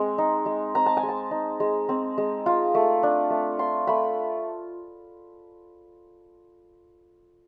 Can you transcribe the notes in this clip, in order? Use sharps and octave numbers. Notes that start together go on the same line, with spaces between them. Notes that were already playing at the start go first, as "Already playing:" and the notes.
Already playing: G#3 C4
D#4
G#3
C4 A#5
A5
G#5
G#3
A5
D#4
G#3
C4
G#3
F4
A3
D4
A3
F4 C6
A3 B5